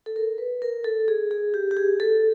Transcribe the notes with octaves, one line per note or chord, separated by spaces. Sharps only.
A4
A#4
B4
A#4
A4
G#4
G#4
G4
G4
G#4
A4